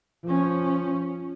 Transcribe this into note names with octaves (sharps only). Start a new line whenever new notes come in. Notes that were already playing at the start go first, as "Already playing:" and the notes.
F3 C#4